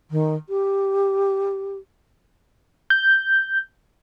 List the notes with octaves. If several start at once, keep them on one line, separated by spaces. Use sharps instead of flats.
D#3
G4
G6